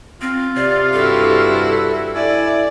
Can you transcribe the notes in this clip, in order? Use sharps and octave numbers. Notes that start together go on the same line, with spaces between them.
C4 F4
C3 D5
G2 E4 F#4 A4
E4 D5 G#5